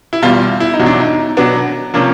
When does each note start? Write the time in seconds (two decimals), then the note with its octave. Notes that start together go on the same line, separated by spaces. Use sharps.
0.13 E4
0.22 E2 B2 G3 F4
0.60 E4
0.74 D#4
0.79 E2 B2 F#3
0.86 D4
1.00 D#4
1.37 B2 F#3 B3 D4
1.94 C3 F3 A#3 C#4 D4